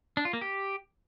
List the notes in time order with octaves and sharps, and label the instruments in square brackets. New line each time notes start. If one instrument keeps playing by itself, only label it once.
[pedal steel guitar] D4
F4
A#3
G4